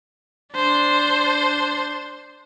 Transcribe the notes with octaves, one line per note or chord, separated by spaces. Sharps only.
D4 C5